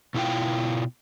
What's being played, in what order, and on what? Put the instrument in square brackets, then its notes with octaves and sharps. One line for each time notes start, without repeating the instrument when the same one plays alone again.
[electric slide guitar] B2 E4 F4 G5